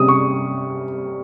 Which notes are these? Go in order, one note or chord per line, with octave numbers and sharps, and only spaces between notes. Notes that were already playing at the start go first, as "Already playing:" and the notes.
Already playing: C3 G3 C#4 D#6
C#6